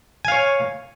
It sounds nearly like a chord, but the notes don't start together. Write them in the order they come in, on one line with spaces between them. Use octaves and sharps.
G#5 F5 C#5